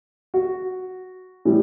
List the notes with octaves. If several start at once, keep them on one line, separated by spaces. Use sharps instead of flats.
F#4
A2 E3 G3